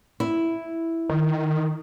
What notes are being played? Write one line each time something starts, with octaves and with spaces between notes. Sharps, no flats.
E4
D#3